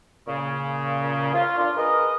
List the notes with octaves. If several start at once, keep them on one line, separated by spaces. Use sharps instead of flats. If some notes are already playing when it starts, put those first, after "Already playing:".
A#2 C#3
F4
D4 F4
G#4 A#4 B4 D#5